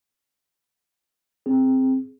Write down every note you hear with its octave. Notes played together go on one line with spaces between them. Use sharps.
C4 G#4